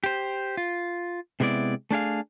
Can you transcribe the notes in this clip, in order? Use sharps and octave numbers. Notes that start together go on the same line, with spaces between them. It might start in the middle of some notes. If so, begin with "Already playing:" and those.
G4 C5
F4
C3 G#3 B3 E4 D5
A3 D4 G#4 F5